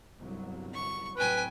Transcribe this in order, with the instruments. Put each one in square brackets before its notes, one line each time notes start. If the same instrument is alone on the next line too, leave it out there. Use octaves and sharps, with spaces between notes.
[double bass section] G1 C2 F#3
[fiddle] C#6
[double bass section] A2 C3 F#3 [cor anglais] B4 [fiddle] G5 G#5